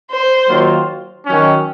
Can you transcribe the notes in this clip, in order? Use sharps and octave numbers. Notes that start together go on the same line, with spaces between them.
C5
D#3 F#3 A#3 F4
D#3 F#3 C#4